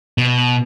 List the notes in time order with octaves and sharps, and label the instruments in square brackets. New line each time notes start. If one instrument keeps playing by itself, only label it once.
[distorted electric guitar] B2